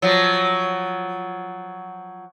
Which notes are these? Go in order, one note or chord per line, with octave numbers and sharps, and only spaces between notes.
F3 F#3